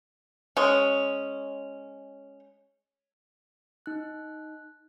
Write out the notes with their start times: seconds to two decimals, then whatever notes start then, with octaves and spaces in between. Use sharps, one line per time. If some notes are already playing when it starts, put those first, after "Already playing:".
0.57 G#3 C#4
3.86 D#4 F#6